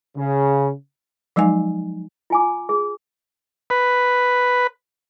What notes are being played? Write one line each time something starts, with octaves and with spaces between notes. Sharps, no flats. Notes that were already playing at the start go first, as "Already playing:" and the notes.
C#3
F3 F#3 G#3 D#4 G#5
F4 G#5 D6
G#4
B4